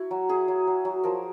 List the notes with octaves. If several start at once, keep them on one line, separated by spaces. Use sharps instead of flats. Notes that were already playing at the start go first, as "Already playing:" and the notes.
Already playing: E4 F#4
F#3
E4 G#4
F#3
F#3
F#3
F3 A#4